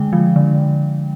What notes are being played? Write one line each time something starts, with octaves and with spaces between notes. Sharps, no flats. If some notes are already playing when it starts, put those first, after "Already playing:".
Already playing: D3 G#3 G5
F3
D3